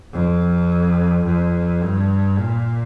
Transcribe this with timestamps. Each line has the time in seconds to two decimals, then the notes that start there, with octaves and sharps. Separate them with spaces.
0.13 F2
1.25 F2
1.82 G2
2.39 A#2